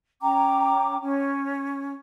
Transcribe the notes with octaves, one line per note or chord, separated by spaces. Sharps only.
C#4 G5 A#5 D6
C#4